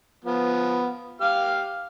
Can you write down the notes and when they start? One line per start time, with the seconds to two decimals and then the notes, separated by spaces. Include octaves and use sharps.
0.25 F3 B3
1.21 G4 F5 F6